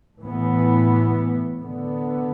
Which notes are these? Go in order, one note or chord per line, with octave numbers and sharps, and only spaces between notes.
A2 E3 B3
D3 B3